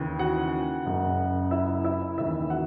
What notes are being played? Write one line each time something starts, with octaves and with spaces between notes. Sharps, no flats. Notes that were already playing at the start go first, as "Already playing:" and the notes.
Already playing: D#2 C#3 E3
F#4 F#5
F#1 F#2 C#3
E4 E5
E4 E5
D#2 C#3 E3 E4 E5
F#4 F#5